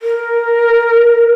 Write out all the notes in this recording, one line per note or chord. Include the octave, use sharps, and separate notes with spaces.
A#4